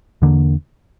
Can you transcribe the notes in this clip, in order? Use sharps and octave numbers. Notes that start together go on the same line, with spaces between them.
E2 D3 A#3